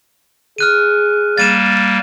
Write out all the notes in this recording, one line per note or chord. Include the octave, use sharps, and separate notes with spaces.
G#4 F6 F#6 D#7
G3 A#3 A6 D#7 E7